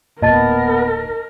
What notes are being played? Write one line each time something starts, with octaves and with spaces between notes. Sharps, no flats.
D1 A#2 B3 A#4 D#5 A5 A6